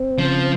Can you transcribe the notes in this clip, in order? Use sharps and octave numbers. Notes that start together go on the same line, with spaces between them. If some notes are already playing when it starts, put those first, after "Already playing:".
Already playing: C4
C#3 F3